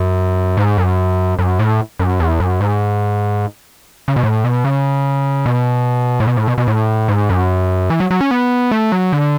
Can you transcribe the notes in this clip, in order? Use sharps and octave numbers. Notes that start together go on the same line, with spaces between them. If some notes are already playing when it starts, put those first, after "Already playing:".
Already playing: F#2
G#2
F#2
F#2
A2
F#2
E2
F#2
G#2
C#3
B2
A2
B2
C#3
B2
A2
B2
A2
B2
B2
A2
G#2
F#2
E3
F#3
F#3
C#4
B3
A3
F#3
D3